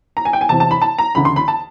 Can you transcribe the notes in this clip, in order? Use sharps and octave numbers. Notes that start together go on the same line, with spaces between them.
A#5
G#5
G5
G#5
E2 C3 E3 A5
A5
B5
A5
A#5
D2 C#3 E3 A3 B5
C6
B5
A5